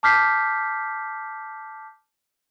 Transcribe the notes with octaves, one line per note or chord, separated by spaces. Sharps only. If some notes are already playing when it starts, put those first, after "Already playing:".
A5 D6 F6 G6 B6 C7